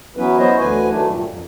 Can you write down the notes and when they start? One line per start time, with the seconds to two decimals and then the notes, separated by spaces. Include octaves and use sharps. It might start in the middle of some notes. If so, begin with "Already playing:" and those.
0.17 E3 F#3 B3 C#4 E4 B4
0.38 B3 E4 C5 C#5 D#5
0.59 D2 D3 E3 B4 G#5
0.90 D#3 F#3 A3 D4
1.07 G2 A#2
1.26 F2